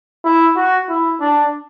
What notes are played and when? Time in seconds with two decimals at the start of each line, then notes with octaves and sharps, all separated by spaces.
0.24 E4
0.56 F#4
0.89 E4
1.20 D4